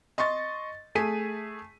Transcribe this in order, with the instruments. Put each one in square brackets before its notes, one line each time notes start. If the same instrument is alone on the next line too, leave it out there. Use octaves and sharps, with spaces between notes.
[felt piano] D#5 C6 C#6 A6
A3 G#4 B6 D#7